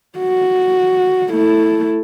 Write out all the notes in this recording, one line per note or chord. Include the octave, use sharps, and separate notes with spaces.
F#4
A3 E4